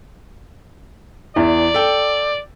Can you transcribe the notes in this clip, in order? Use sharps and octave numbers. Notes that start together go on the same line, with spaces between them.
E2 E3 D5
A4 G5